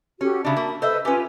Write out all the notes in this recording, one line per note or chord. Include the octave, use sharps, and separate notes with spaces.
C#4 F#4 G4 A4
C#3 D4 E5 A5 B5
A#3
A4 B4 C5 D#5 E5 E6
C#4 F4 G4 B4 G#5